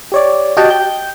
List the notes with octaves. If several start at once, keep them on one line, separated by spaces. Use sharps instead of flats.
G4 C#5 D5
F#4 G4 D#5 F#5 G5 A5
G5 G6